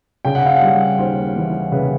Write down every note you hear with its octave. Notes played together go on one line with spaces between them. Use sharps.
C#3 G5
F#5
F5
G3 F#5
D#2 C5
E3
C#3 B4